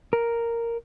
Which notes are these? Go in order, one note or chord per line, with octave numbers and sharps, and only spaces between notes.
A#4